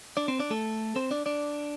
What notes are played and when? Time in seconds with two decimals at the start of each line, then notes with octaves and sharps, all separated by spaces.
0.17 D4 D5
0.28 C4 C5
0.39 D4 D5
0.50 A3 A4
0.96 C4 C5
1.11 D4 D5
1.26 D4 D5